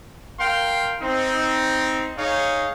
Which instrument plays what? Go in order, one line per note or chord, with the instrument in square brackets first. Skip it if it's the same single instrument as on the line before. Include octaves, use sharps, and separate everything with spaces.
[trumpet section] A#4 F5 G5 C6
C4 D#4
D#4 G#4 C#5 F5